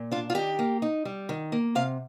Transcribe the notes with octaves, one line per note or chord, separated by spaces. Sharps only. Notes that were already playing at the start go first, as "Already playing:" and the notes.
Already playing: A#2
D4 F4
F4
D#3 G4
A#3
D#4
G3
D#3
A#3
C3 F5